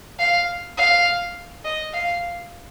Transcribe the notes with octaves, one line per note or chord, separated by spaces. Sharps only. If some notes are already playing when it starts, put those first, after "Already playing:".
F5
F5
D#5
F5